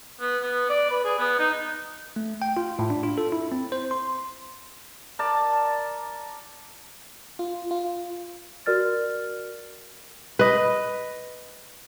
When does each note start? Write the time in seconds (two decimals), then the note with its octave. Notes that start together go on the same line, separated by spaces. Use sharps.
0.21 B3
0.42 B3
0.69 D5
0.91 B4
1.05 G#4
1.19 B3
1.39 D#4
2.16 A3
2.42 G5
2.57 F4
2.79 A2
2.90 D4
3.03 F4
3.18 A4
3.32 E4
3.52 C4
3.72 C5
3.91 C6
5.19 A#4 D5 A5
7.39 F4
7.71 F4
8.66 F#4 A#4 D5 F6 A6
10.39 B4 D#5